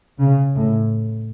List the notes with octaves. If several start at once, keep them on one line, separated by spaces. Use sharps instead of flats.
C#3
A2